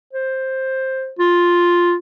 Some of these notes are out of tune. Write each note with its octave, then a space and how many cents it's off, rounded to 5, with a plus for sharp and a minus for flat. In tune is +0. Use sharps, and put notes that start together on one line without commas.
C5 +10
F4 +0